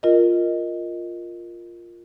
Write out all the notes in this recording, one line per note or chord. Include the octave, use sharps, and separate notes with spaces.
F4 A#4 D#5